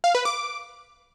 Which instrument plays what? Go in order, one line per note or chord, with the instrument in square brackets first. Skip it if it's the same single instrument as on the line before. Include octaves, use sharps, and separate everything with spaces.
[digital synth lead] F5
B4
D6